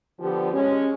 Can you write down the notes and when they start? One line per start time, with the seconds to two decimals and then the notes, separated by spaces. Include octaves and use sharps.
0.19 D3 F3 B3 G4
0.52 G#3 C#4